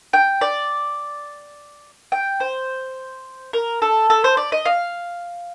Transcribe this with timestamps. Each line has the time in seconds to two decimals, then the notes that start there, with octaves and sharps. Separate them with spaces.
0.13 G5
0.41 D5
2.12 G5
2.40 C5
3.53 A#4
3.82 A4
4.10 A4
4.24 C5
4.37 D5
4.52 D#5
4.65 F5